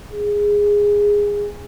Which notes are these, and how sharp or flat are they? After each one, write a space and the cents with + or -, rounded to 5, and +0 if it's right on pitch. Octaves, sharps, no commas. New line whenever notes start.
G#4 -15